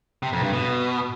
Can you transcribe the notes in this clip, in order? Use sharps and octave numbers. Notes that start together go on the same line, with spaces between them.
C3
F2
G2
B2